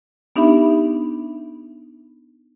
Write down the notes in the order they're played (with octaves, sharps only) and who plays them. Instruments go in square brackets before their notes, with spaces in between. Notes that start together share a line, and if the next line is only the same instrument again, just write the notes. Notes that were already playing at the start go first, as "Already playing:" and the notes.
[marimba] B3 D4 D#4 G4 E5 B5